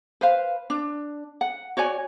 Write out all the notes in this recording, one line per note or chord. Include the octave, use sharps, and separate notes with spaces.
B4 C5 F5
D4
F#5
F#4 C#5 D5 G#5